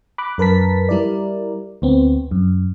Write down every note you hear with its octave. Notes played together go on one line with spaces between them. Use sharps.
B5 D6 F#6
F#2 A#4 B4 A5 B6
G3 E4 A#4 D5
D2 B3 C4
F#2